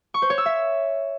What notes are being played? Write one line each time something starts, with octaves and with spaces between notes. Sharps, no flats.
C#6
C5
C#5
E6
E5